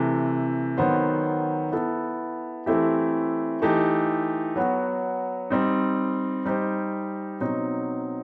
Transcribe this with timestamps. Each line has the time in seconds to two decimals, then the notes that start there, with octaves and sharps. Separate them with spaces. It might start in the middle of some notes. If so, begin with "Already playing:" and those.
Already playing: C3 E3 A3
0.78 D#3 F#3 B3 F#4 C5
1.72 B3 E4 A4
2.66 E3 A3 C4 E4 G4
3.62 E3 A3 D#4 G4
4.56 F#3 B3 F#4
5.50 G3 C4 D#4
6.45 G3 D#4 G4 C5
7.40 B2 F#3 C4 D#4